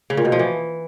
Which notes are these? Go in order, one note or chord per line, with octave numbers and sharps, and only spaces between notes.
C#3
A#2
B2
F3
E3